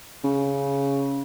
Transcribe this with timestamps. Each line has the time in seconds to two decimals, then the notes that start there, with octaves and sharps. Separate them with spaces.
0.24 C#3